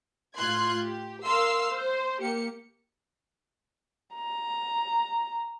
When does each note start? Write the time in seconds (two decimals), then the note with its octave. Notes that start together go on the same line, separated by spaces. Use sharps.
0.36 A2 F4 C6 F#6 G#6
0.84 G4
1.25 A#4 F5 C6 E6 C7
1.71 C5
2.21 A#3 G4 C#7
4.14 A#5